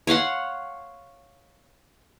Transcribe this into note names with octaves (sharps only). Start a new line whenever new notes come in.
C#5 F5 F#5 C6